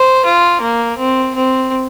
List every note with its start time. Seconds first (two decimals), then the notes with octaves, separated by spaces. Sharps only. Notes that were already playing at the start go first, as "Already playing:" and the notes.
Already playing: C5
0.25 F4
0.61 A#3
0.98 C4
1.35 C4